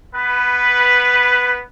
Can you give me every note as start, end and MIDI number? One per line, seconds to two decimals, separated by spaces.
0.15 1.60 59
0.15 1.60 71